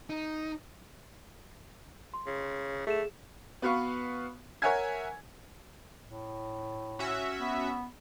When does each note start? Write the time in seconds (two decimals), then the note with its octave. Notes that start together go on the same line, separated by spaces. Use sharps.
0.10 D#4
2.14 C6
2.27 C#3
2.87 A3 G#4 E7
3.62 B3 F#4 B4 F5 C#6
4.62 A#4 C#5 E5 F#5 G#5 G#6
6.07 A2
6.99 C#4 F#4 E5
7.40 B3